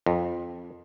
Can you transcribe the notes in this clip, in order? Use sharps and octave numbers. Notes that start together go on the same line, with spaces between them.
F2